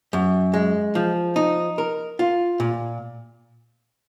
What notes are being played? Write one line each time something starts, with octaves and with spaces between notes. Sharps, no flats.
F#2
G#3
F3
D#4
A#4
F4
A#2